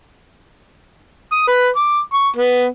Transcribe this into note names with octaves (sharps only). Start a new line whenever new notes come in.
D#6
B4
D6
C#6
B3